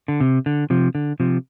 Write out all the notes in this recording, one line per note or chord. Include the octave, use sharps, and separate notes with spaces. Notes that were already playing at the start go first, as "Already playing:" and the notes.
D3
C3
D3
C3 F3
D3
C3 F3